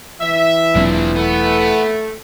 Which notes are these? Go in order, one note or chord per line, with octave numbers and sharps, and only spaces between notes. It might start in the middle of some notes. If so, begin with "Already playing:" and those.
E3 E5
E1 A#2 F#3 C4 D4
A3 B3